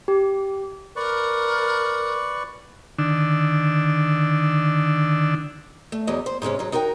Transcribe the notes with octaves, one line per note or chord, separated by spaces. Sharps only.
G4
A#4 B4 D5 C#6
D3 D#3 D4 E6
A3
E2 G#2 F#3 D#5
C5
G#2 C3 G#3 C#4
G#2 F#3
D#4 F#4 A#4 C5 G5